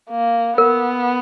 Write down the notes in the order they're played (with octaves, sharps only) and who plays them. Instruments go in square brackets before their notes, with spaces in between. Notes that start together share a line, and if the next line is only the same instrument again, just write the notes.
[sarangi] A#3
[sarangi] B3 [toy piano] A#4